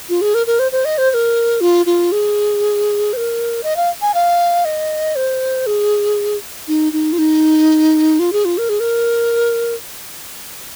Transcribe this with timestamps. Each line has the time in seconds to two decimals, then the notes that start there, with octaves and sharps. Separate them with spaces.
0.09 F4
0.21 G#4
0.34 A#4
0.47 A#4
0.59 C5
0.72 C5
0.85 D#5
0.98 C5
1.11 C5
1.14 A#4
1.61 F4
1.86 F4
2.12 G#4
3.13 C5
3.17 A#4
3.63 D#5
3.76 F5
4.02 G#5
4.14 F5
4.65 D#5
5.16 C5
5.67 G#4
6.68 D#4
6.93 D#4
7.13 F4
7.18 D#4
8.19 F4
8.33 G#4
8.45 F4
8.58 A#4
8.69 G#4
8.80 A#4